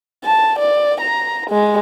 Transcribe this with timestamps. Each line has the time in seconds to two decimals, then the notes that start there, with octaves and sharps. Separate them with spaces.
0.25 A5
0.59 D5
1.01 A#5
1.50 G#3